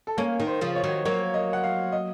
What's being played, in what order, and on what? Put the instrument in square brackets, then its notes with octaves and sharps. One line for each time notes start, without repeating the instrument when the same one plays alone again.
[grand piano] A4
[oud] A#3 C#4 [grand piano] A#4
[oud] D#3
[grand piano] C5
[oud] C#3 F3
[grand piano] C#5
[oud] D#3 F#3
[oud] F#3 A#3 [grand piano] C#5
[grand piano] D#5
F#5
F5
D#5